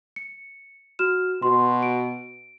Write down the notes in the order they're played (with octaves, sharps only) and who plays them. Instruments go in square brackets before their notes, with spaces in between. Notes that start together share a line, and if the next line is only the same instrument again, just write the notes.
[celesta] C#7
F#4 F6 E7
[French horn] B2 [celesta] F#4 C6
[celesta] D7